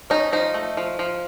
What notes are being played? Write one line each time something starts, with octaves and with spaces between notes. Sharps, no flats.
C#4 D#4
F3 D#4
A3
F3
F3